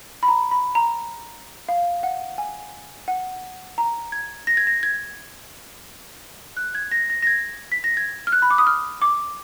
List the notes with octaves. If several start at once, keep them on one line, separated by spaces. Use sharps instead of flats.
B5
A#5
B5
A#5
F5
F#5
G#5
F#5
A#5
G#6
A#6
G#6
A#6
G#6
F#6
G#6
A#6
A#6
A#6
G#6
B6
A#6
G#6
F6
F#6
B5
D6
D#6
F6
D6